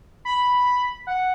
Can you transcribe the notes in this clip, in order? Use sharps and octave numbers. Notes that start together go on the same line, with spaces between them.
B5
F#5